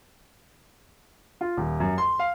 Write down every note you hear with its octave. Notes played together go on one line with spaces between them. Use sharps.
F4
D#1
F#2
C6
F5